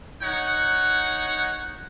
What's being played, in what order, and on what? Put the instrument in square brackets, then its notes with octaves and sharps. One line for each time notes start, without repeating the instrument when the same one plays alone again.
[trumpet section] D#4 C#5 F#5